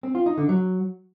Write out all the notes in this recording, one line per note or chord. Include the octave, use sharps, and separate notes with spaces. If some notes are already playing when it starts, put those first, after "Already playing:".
C4
F4
D#4
D3
F#3